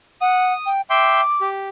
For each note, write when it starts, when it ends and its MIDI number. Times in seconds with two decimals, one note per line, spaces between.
0.21 0.53 78
0.21 0.69 87
0.66 0.81 79
0.90 1.21 76
0.90 1.21 79
0.90 1.21 84
0.90 1.47 86
1.41 1.69 67